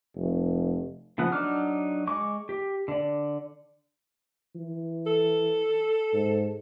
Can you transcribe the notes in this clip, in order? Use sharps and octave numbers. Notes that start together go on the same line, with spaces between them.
F1
C#3 F3 B3 F#5
F#3 D4 D#4 D6 F6
G#3 C#6 D6
G4
D3 D5
E3
A4
G#2